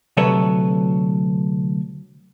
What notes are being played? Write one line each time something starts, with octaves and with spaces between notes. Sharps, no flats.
D2 C3 F#3 A4 B4 C#5